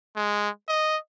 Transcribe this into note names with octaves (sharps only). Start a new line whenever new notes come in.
G#3
D#5